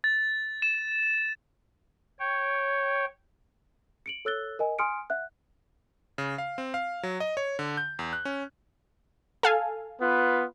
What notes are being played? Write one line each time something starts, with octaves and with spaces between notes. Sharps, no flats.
A6
E7
C#5 G5
C#7 D7 F#7
A4 C#5 E6 F#6 A6 G7
A#4 D#5 G#5
G#5 C6 D#6 F6 C#7 D7
E5 F#5 F#6
C#3
F5
C4
F5
F#3
D#5
C#5
D3
G6
E2
F#6
C#4
A4 F5 G#5
B3 F4 B4